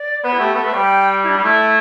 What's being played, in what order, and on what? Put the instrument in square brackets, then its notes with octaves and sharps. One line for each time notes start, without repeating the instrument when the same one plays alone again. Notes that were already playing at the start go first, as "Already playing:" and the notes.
Already playing: [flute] D5
[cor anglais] B3 [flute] B4
[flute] E4
[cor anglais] A3 [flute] G4
[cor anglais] B3 [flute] A4
[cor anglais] A3 [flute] B4
[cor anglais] G3 [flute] G5
[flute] E4
D4
[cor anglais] G3 [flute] G4
[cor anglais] A3 [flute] E4